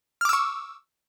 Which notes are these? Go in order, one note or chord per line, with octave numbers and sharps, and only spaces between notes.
C#6 D6 E6 F6